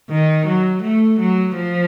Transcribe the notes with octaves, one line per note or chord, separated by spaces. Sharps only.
D#3
F#3
A3
F#3
F3